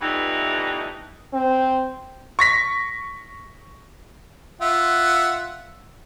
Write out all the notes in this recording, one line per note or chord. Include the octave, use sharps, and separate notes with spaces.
E3 F3 G3 A3 B3 D#4
C4
C#6 A#6 B6
F4 E5 F#5